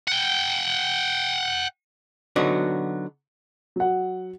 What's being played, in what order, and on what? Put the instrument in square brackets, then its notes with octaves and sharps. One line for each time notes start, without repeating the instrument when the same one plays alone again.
[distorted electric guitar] F#5 G5
[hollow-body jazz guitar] D3 F#3 B3 D#4 F#4
[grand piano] F#3 F#5